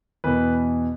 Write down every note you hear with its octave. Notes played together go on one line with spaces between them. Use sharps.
E2 B2 B3 B4